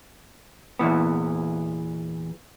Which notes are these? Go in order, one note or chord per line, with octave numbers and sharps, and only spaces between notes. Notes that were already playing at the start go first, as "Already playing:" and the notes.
E2 A#2 E3 B3